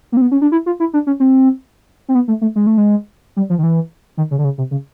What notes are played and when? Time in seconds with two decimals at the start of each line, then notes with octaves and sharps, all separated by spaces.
0.12 A#3
0.17 C4
0.21 B3
0.31 C#4
0.42 D4
0.52 E4
0.66 F4
0.80 E4
0.93 D4
1.07 C#4
1.20 C4
2.08 C4
2.15 B3
2.28 A3
2.41 A3
2.56 G#3
2.67 A3
2.77 G#3
3.37 G3
3.50 F3
3.58 D#3
3.63 E3
4.17 D#3
4.31 C#3
4.39 D3
4.44 C#3
4.58 C3
4.71 C#3